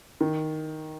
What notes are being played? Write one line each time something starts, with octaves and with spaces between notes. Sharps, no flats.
D#3